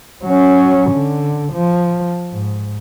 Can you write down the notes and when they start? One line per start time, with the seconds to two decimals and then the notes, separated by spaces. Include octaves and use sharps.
0.25 F#3 C#4
0.90 D3
1.53 F3
2.32 G#2